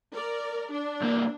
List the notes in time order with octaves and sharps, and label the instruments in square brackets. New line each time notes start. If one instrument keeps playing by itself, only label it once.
[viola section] A#4 D5
D4
[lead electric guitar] C2 A#3